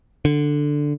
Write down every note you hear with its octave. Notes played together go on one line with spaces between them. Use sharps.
D3